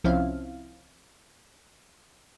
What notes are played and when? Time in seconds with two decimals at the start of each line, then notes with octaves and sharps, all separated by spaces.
0.04 C2 F3 C4 C#4 E4 F5